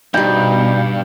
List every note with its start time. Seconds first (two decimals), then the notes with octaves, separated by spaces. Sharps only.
0.14 G2 B2 G3 D#4 G5